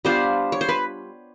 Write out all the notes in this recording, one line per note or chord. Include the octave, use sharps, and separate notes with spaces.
G3 B3 D4 F4 C5
C#5
C5
B4